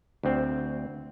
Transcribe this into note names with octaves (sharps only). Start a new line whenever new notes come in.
D2 C4